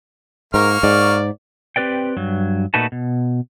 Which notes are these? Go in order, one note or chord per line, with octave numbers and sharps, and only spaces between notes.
G#2 A#3 A#4 C#6 F6
G#2 D5
C4 G4 B4 D5 G5
G2 F#3
A#2 A3 D#4 F#4 B4 A5
B2